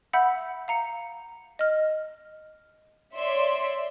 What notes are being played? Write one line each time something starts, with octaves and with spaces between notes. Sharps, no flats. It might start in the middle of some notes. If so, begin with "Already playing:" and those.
E5 F#5 B5 E6 G6
F5 A#5 C#7
D#5 F6
C#5 D5 E5 C6